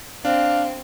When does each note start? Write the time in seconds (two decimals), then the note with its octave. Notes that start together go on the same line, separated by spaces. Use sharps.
0.25 C4 D4 F5